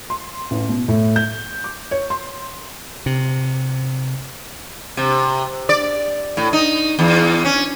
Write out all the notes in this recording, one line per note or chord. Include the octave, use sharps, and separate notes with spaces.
C6
A1
B2
A2
G6
D6
C#5
C6
C3
C3
D5
A2
D#4
E2
C#4